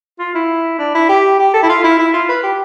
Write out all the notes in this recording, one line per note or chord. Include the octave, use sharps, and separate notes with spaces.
F4
E4
D4
E4
G4
G4
A4
E4
F4
E4
E4
F4
B4
G4